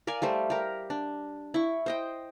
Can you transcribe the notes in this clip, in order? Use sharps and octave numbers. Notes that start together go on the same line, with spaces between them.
A#4 D5 F5 G#5
G3 A3 C5
G4 A#4
D4
E4 C#6
C5 D#5 G5